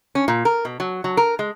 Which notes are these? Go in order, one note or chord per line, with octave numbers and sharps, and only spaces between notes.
C#4
A#2
A#4
B2
F#3
F#3
A#4
G#3